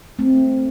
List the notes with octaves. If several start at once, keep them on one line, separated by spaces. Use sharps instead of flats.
A3 C4